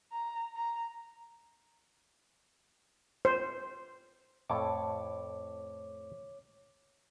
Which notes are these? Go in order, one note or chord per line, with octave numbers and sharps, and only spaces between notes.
A#5
A#5
C5
F2 A2 A4 C#5 D6